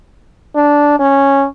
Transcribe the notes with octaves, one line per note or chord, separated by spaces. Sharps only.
D4
C#4